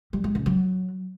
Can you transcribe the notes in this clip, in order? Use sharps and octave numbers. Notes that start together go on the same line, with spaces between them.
G3
G#3
C#3
F#3